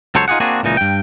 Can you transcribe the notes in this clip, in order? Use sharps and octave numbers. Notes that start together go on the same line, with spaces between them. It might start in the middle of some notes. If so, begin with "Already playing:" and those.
C#2 F#3 A4 C5 C#5
D#4 F4 G4 G#4 F#5
A#3 C4 D4 F#4 G#4
C#2 A#2 E3 D#4
G2 G5